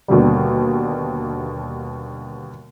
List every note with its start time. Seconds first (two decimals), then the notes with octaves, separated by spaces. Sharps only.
0.08 D#2 B2 D3 G3